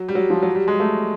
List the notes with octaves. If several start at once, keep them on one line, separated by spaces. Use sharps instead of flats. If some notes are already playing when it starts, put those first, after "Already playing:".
Already playing: F#3
G3
F#3
F3
F#3
G3
G#3
A3